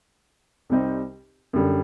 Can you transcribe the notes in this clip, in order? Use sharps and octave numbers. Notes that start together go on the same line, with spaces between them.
C2 C3 G3 C4 D#4
F#2 D3 G3